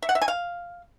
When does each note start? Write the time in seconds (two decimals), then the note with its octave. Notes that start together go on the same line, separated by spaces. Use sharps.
0.02 E5
0.09 F#5
0.15 E5
0.22 G#5
0.28 F5